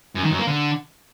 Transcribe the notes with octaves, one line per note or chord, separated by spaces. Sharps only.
F#2
D#3
F#2
A#3
D3